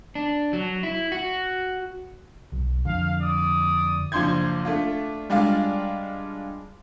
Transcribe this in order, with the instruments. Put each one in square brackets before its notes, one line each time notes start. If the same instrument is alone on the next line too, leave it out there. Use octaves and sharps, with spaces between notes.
[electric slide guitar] D4
F#3
E4
F#4
[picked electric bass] B1
[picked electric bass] F2 D3 [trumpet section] F5
[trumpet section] D5 D#6
[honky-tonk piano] F#1 F3 D4 C6 G6 G#6
A3 D4 F4
G3 G#3 D4 F4 D5 F5